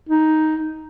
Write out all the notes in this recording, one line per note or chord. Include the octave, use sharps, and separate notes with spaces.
D#4